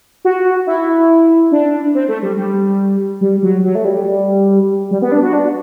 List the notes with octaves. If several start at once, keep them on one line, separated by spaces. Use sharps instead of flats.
F#4
E4
D4
C4
A3
G3
G3
G3
F#3
F#3
A3
G3
G3
B3
D4
F#4
D4